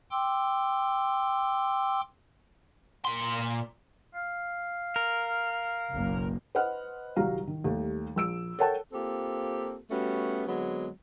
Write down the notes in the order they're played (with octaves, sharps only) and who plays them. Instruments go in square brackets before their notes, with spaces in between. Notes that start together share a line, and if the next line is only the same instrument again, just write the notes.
[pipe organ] G5 C6 D6 E6
[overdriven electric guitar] A#2 C6
[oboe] F5
[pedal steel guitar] A#4
[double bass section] F#1 B1 A#3
[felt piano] B4 C5 D#5 F#5 F6
D#1 C2 F#3 G3 F5 A#5
D#3
D#2 G3 A3
A#1 E6 D7
A4 A#4 C#5 F#5 G5 A5
[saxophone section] A#3 C4 F4 G4 A4
G3 A3 B3 C#4 F#4
D3 F#3 G#3 B3 C4